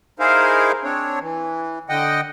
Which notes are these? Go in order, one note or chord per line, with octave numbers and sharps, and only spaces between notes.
D#4 E4 G#4 A#4 C5 F5
C4 D4 C#5
E3
D3 D#5 F#5 G5